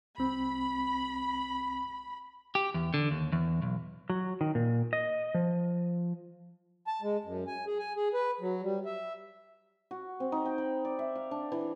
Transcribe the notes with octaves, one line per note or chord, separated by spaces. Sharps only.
C2 C4 B5
G4
E2
D3
D#2
E2
B1
F#3
D#3
A#2
D#5
F3
A5
G#3
F#2
G#5
G#4
G#5
G#4
B4
F#3
G3
E5
F#4
C4
D#4
G5
B5
D5
E5
F5
D4
E3